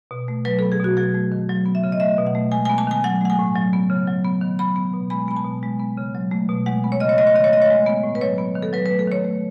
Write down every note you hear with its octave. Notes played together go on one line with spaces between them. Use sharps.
B2
A3
F#3 B4
A4
B3
G#4
B2
F#4
F#3 G#4
A3
D#3
F#3
B3
E5
C#3
D#5
A3 E5
B2
F#5
A3
G#3 G#5
G#5
B3
A5
D#3 G#5
F#3 F#5
A3 F#5
G#5
A2
F#3
B3
C#3
F#3
B3
D#3
F#3 B5
B3
B2
G#3 B5
B3 B5
A5
B2
G#3
B3
C#3
F#3
A3
B2
G#3 F#5
B3
C#5
C#3 D#5
C#5
A3 D#5
C#5
D#3 D#5
C#5
A3 D#5
C#5
G#3
B3
A2
B4
F#3 C#5
B3
D#3
A4
F#3 B4
B4
A3
A4
D#3 C#5
A3